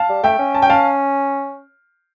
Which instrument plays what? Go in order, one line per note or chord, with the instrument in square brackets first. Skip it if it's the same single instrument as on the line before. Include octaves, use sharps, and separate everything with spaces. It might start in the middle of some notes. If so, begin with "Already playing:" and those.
Already playing: [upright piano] F5 A5
[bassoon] G3
[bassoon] A3 [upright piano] E5 G5
[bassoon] C#4
[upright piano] A5
G5
F5 A5